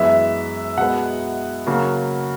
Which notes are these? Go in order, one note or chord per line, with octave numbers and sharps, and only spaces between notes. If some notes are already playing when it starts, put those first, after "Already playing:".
Already playing: F#2 E3 G#3 B3 E5
B2 G#3 B3 F#5
C#3 F#3 A#3